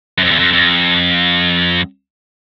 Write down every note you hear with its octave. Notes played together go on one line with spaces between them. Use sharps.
F#2
F2
E2
F2
F2